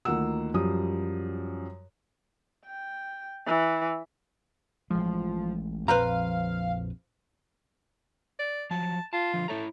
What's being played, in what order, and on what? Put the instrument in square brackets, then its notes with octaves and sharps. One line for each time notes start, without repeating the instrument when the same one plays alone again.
[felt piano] D2 D#3 A#3 F4 F#5 E6
F#2 F3 G3 D#6
[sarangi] G5
E3
[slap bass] A1 G#3 [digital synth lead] F3
[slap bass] A#1 F2 [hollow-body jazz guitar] B4 C5 A#5 [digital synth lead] F5
[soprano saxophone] D5
[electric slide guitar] F3 F#3 [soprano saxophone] A5
[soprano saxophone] F4 [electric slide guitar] A5
[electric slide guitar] D3 F3
[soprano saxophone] A3 [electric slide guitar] E4 C#5 A#5